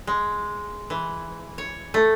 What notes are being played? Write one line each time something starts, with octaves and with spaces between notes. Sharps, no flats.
G#3
E3
C#5
A3